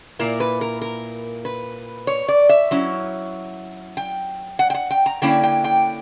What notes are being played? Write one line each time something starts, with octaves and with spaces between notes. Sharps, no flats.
A#2 A#3 E4 A#4
B4
A#4
A#4
B4
C#5
D5
E5
F#3 C#4 E4
G5
F#5
G5
F#5
G5
A#5
D3 A#3 C#4 E4 G5
G5
G5